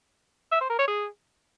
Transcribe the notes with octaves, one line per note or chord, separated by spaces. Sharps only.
E5
C5
A#4
C#5
G#4